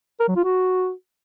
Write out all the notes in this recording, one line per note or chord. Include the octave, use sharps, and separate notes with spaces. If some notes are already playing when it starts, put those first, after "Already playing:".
A#4
F#3
F4
F#4